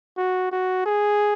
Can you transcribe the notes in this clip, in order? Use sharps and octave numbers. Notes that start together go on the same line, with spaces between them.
F#4
F#4
G#4